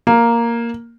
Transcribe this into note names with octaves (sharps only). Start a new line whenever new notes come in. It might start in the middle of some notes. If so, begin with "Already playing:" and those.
A#3